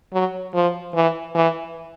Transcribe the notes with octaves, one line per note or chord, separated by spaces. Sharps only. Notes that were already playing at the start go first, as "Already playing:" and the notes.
F#3
F3
E3
E3